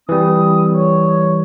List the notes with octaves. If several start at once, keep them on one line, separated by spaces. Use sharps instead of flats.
E3 G3 C4 D#6
C#5